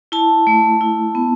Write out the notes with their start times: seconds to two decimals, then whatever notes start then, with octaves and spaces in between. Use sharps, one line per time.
0.12 E4 A5
0.47 A3
0.81 E4
1.15 B3